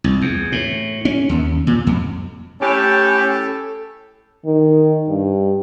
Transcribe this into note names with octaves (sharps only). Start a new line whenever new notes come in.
C2
E2
A2
C#4
D#2
A#2
F2
A2 C#4 G4 A4
D#3
G2